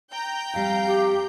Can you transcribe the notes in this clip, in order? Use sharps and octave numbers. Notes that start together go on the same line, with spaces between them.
G5 A#5 G6
F2 G3 F5
G4